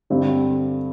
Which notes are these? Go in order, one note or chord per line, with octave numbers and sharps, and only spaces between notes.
G2 D3 C4